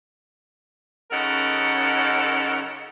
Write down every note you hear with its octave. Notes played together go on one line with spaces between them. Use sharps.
F#2 C#3 D#4 A4 A#4 F#5